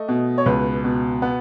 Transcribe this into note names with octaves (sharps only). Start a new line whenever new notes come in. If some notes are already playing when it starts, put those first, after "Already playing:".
Already playing: A3 D#5
B2
C#5
C#2 B4
B2
B3